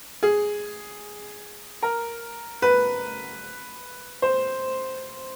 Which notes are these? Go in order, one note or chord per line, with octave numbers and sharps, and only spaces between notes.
G#4
A#4
B4
C5